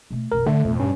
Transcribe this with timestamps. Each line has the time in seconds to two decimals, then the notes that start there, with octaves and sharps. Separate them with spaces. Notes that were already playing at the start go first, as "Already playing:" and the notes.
0.10 B2 A3
0.32 F#1 B1 A#4
0.46 A2 D3 A3
0.64 A1 F2 B2
0.80 G2 C#4